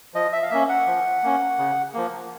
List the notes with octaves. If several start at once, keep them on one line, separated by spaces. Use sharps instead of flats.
F3 D#5
E5
F5
A#3 C#4 E5
F#5
F3
A#3 C#4
C#3
F3 A#3